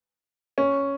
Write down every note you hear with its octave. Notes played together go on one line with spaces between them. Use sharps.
C#4